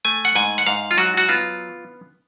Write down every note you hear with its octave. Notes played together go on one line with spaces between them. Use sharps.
A3 G#5
F#5
G#2 G#5
F#5
G#2 F5
F4
F#3 F#4
F#4
B3 F4